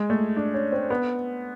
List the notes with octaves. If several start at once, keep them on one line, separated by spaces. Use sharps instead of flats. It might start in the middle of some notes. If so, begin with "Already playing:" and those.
Already playing: G#3
A3
D4
C#4
C4
B3